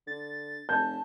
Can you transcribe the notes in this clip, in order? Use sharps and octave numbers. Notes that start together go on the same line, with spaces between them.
D3 A6
F1 A5 G6